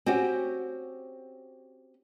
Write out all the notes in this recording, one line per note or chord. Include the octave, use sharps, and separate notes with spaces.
C4 C#4 F#4 G4